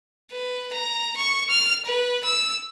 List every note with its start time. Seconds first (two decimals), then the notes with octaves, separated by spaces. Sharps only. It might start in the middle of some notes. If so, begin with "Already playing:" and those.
0.31 B4
0.73 A#5
1.17 C#6
1.50 F6
1.86 B4
2.24 E6